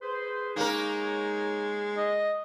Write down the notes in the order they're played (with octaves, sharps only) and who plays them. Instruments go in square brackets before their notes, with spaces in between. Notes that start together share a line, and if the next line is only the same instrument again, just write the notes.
[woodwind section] G#4 B4 C5
[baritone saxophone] G#3 [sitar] A#3 A#4 [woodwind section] D#4 C#5
[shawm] D#5